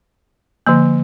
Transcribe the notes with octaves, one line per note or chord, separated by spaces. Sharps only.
D3 F3 A#3